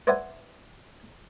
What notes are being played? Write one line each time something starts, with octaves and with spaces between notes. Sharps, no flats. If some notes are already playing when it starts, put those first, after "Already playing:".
B4 C5 D5 E5 F#5 G#5